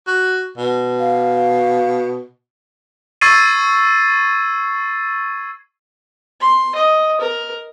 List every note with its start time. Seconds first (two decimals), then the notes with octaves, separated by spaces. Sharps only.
0.07 F#4
0.57 B2
1.00 F5
3.21 C#6 E6 G#6 A6 C7 D#7
6.41 C6
6.75 D#5
7.20 A#4